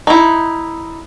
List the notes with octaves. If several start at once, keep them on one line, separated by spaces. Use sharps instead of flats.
D#4 E4